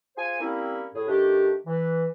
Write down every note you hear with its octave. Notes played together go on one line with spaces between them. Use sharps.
F4 G#4 C5 G#5
G3 A#3 C4 C#4 E4
A2 G#4
D#3 A3 D4 G4
E3